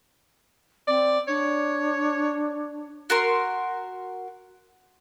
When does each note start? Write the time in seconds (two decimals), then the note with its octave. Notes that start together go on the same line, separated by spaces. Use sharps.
0.88 C4 D5
1.28 D4 C#5
3.10 F#4 A#4 C6